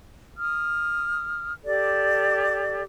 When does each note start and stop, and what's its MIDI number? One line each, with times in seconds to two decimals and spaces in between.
0.38 1.53 87
0.38 1.53 89
1.65 2.83 67
1.65 2.83 69
1.65 2.83 74